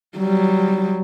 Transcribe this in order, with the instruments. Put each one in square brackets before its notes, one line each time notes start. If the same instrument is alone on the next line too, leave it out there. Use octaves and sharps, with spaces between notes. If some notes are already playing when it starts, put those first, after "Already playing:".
[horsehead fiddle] F#3 G3